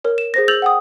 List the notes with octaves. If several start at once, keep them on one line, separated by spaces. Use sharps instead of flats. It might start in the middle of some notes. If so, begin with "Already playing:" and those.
A#4 C#5
E7
G#4 C5 A#6
E6 G6 A6 F7 F#7
F#5 G5 D#6